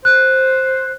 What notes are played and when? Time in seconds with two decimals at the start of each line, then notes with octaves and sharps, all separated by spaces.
0.05 C5 F#6